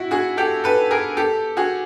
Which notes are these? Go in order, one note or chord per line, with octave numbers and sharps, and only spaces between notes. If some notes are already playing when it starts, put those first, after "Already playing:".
Already playing: E4 F#4
F#4 G#4
G4 A4
A4 B4
G#4 A#4
G4 A4
F#4 G#4